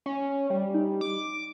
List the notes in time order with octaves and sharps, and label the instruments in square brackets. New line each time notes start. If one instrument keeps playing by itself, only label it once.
[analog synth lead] C#4
G3
[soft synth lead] D#4
[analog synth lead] D6